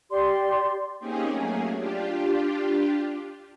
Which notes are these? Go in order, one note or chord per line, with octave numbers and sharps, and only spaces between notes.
G4 D5 C6
A#3 C4 C#4 D#4 G4 G#4
F#3 A3 A#3 C#4 G#4
D4 F4 G4